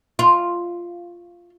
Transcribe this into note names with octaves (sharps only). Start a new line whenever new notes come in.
F4